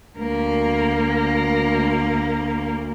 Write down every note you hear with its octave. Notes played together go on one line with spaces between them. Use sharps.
D2 A#3